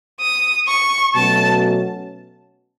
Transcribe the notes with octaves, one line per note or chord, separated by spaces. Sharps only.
D#6
C#6
B2 F#3 A3 C#4 A5